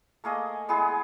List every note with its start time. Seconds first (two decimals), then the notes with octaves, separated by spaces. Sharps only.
0.24 A3 A#3 G#4 D#5
0.69 G#3 B3 E4 G#4